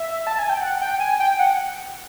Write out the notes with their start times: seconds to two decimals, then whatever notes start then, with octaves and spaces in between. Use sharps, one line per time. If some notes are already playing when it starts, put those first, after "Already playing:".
Already playing: E5
0.27 A5
0.39 G#5
0.49 G5
0.61 F#5
0.81 G5
1.00 G#5
1.20 G5
1.39 F#5